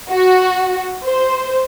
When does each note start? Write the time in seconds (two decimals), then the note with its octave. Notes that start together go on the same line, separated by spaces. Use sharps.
0.10 F#4
1.05 C5